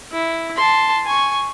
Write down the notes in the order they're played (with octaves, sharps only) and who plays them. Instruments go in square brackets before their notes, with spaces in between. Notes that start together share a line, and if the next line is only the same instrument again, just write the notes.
[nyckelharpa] E4
A5 C6
G#5 C#6